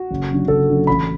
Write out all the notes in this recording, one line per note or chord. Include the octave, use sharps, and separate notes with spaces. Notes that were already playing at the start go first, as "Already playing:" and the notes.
Already playing: F#4
F#1
F#2 D3
F#1 A4
F#2 D3
A1 B5